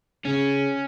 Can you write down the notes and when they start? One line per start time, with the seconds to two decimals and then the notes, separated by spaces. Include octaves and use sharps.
0.25 C#3 C#4